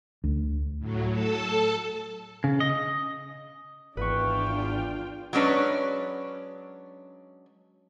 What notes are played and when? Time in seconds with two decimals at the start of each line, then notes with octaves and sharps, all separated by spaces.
0.24 D2
0.79 A2 F#3
1.11 A4 A5
2.44 C#3
2.60 D#5
3.97 G#1 E2 D4 F4 B4 G5 C#6
5.33 F#3 G#3 C#4 D4 B4 C#5